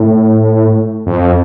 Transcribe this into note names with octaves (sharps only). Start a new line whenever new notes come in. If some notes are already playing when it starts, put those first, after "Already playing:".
Already playing: A2
F2